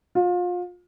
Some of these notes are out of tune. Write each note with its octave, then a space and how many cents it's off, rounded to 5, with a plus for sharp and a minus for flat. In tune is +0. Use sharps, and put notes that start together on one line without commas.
F4 +30